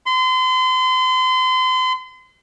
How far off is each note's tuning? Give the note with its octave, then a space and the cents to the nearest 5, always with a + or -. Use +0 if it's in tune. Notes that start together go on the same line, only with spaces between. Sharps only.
C6 -35